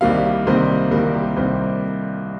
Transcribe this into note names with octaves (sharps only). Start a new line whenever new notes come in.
C2 C3 D#3 G3 A#3 F5
C2 C3 D#3 G3 A#3 C5
C2 C3 D#3 G3 A#3 A#4
G4
C2 C3 D#3 G3 A#3 C5